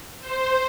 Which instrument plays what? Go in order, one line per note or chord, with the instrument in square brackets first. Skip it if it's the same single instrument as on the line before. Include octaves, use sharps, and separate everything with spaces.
[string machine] C5